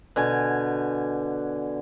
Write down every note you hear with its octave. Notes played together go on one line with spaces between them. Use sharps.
B2 D3 G#5